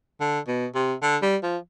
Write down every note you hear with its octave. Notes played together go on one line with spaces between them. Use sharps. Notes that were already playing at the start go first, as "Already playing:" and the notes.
D3
B2
C3
D3
G3
F3